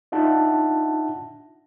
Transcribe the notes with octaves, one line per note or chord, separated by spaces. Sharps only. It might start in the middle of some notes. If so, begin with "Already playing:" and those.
D4 D#4 F4 E5 F#5 A5